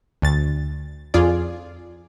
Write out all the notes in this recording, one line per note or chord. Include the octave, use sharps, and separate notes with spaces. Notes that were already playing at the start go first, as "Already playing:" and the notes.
D2 A6
F2 F4 G#4 D5